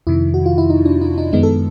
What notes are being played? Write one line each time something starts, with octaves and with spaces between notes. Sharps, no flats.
F2 C3 D#3 E4
F#4
F4
E4
D#4
D4
D#4
D#4
F#2 D#3 G#3 B3 D#4
A4